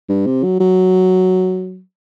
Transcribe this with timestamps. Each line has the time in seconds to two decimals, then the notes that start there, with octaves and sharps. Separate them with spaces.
0.09 G2
0.26 C3
0.44 F#3
0.60 F#3